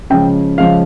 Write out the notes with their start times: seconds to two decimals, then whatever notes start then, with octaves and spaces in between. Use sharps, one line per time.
0.10 C#3 F3 G#3 G5
0.58 C#3 F3 G#3 F5